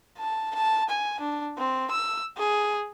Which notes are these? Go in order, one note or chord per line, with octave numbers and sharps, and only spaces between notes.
A5
A5
G#5
D4
C4
E6
G#4